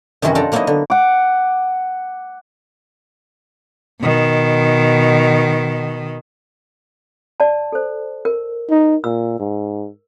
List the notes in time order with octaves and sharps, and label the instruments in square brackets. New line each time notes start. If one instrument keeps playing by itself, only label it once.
[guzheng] F#2 C3 D#3 E3 C#4 F#4
D4 F4 A4 D5 G5 A#5
F#3 A#3 B3 D#4 E4 D#5
D3
[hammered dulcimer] F#5 D6
[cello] B2 D#3
[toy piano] D5 A5
A4 C5
A#4
[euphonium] D#4
[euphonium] A#2 [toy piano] E6
[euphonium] G#2